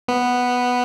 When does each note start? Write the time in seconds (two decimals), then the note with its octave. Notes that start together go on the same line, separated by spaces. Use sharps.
0.08 B3